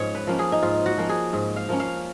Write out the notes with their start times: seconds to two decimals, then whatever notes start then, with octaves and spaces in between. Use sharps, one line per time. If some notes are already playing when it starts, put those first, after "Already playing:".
Already playing: G#2 F3 C#4 C#5 D#5
0.15 B4
0.27 F3 A#3 C#4
0.39 G#4
0.52 D#4
0.62 G#2 F4
0.86 F#4
0.97 F3 A#3 C#4
1.09 G#4
1.33 G#2
1.56 F5
1.68 F3 A#3 C#4
1.80 F5